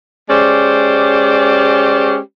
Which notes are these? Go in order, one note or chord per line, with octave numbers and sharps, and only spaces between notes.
G#3 C#4 G4 C5 D5